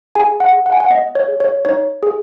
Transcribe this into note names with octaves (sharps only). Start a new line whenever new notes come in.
G#4 G#5
F#5
G#4
F#5
G#5
F#5
B3 D#5
C#5
G#4
C#5
D#4 C#5
G#4